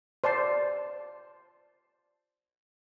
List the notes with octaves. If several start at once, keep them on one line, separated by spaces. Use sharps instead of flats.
C5 D5 A5 C6